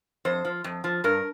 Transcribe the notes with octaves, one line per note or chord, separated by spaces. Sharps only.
F2 C5
F3
F2
F3
G2 A#4